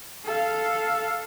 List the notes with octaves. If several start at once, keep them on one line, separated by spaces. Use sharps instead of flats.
A4 F5